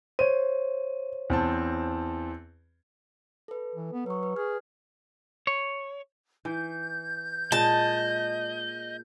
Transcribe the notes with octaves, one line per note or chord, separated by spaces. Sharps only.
C5 C#5 D#7
E2 C4 A5
A4 B4
E3
B3
F#3 B4 C#6
B4
G#4 F6
C#5
E3 G6
A#2 G#3 D#5 A5